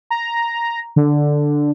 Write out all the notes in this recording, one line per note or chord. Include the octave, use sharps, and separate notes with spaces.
A#5
D3